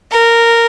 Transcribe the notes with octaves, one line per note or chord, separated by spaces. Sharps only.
A#4